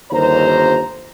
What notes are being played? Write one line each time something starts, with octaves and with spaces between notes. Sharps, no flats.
G1 D#2 C5 A#5